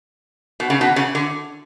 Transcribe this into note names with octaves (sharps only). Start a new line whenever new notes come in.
B2
C#3
B2
C#3
D3